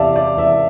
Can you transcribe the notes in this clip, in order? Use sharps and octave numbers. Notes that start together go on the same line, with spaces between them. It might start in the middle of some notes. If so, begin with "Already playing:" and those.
Already playing: E2 C3 D5 E5 F5 A5
D5
E2 E5